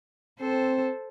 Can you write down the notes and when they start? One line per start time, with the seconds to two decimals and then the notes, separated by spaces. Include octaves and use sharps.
0.40 C4 A4 C5